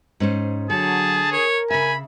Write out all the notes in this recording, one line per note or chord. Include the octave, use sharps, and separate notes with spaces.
G#2 C#4 C5
D3 F#3 G#4 A5
A#4 C#5
C#3 E5 G#5 B5